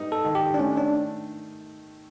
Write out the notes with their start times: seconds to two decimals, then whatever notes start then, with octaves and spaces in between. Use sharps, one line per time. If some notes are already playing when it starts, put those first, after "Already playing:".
Already playing: G3 B3 D#4
0.12 A4
0.25 D#3
0.35 G4
0.54 D4
0.59 A3 C#4
0.77 D4